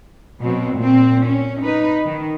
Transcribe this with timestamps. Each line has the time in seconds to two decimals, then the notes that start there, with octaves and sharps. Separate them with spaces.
0.43 B2 F#3 C4
0.78 A#2 C4
1.25 C#4
1.60 D#4 B4
2.06 D#3